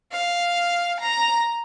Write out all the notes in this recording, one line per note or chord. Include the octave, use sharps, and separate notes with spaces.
F5
A#5